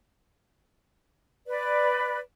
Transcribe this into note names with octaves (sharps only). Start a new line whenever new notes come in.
B4 D5